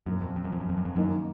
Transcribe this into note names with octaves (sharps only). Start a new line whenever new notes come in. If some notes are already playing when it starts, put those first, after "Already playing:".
F#2 A#2 F3 A#3
F2
F2
F#2
F2
F#2
F2
F#2
F2
F#2 D#3 A#3 D#4